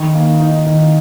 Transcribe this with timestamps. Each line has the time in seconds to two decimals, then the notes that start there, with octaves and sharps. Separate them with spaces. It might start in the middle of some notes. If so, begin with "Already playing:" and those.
Already playing: D#3
0.15 A#3
0.40 D#4
0.66 D#3